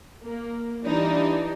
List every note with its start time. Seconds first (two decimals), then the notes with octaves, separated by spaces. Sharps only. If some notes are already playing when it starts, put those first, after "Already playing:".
0.24 A#3
0.84 E3 G3 D4 D#4